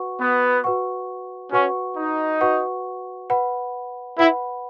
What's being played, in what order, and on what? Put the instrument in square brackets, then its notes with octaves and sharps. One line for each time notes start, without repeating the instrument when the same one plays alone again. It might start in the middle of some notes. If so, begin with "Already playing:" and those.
Already playing: [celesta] F#4 B4 F#5 C#6
[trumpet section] B3
[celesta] F#4 B4 F#5 C#6
[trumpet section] C#4 [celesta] F#4 B4 F#5 C#6
[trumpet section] D#4
[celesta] F#4 B4 F#5 C#6
B4 F#5 B5
[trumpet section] E4 [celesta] B4 F#5 B5